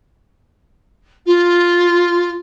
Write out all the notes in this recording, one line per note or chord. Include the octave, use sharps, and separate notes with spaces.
F4